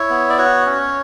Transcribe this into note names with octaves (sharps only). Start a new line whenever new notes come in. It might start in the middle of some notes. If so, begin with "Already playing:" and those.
Already playing: E4 C#5
B3
D5
F#4 C#5
C#4